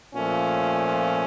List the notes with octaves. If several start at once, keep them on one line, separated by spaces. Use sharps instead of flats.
A#2 F3 A3 C#4